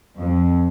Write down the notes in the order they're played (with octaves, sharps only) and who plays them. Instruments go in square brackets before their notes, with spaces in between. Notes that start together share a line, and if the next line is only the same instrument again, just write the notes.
[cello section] F2